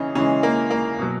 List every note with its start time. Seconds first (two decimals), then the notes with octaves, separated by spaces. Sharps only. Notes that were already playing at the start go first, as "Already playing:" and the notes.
Already playing: C#3 E3 C#4 D#4
0.15 C#3 E3 G#3 C#4
0.43 A#3
0.70 A#3
0.99 B2 F#3